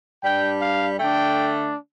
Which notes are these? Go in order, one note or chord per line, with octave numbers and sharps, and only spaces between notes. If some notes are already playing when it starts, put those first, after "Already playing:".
G2 G3 D4 G5
F5
D3 A3 D4 G5